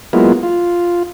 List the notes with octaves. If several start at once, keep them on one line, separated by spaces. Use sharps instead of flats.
F#3 G#3 A#3 B3 E4 F4
F4